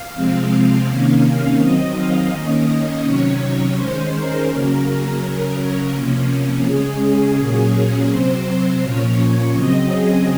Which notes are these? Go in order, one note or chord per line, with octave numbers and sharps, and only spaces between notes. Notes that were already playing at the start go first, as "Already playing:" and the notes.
Already playing: F5
C3 F3 G#3 C4
C3 D#3 A#3 C#4
D#3 F#3 C4 D#5
F5
D#3 A#3 C#4 D#5
C3 D#3 F#3 C#4 C#5
C#5
D#3 G#3 C#4 C5
A#4
C#3 F#3 A#3 C#4 A#4
C#3 F#3 C#4
C3 F3 A#3 C#4
C#3 G#3 C#4 G#4
A#2 F#3 A#3 C#4
C3 F#3 C4 C5
A#2 F3 A#3 C#4 C#5
C#3 F#3 C4 D#5
G#4